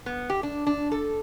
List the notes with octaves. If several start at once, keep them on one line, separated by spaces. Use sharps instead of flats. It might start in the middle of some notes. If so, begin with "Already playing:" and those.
B3
G4
D4
D4
A4